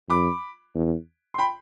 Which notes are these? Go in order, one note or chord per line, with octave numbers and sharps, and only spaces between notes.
F2 B5 D6
E2
C6
G5 B5